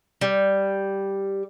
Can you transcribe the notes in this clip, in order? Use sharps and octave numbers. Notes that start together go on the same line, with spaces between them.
G3